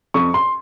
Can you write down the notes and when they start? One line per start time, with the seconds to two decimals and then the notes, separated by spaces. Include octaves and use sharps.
0.14 F2 C#6
0.34 C6